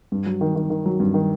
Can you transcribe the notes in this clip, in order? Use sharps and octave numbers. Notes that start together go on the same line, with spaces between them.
G2
F#3
D#3
D#3
D#3
F#3
G2
D#3